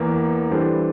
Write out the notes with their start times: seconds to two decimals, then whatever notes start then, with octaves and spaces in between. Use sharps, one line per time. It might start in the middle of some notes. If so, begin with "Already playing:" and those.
Already playing: E2 E3 A#3
0.51 E3 G3 D4 A4 C5